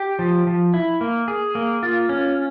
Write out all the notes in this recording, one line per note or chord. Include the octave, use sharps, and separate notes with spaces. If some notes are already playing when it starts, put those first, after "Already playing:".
Already playing: G4
F3
F3
E4
A#3
G#4
A#3
F4
C#4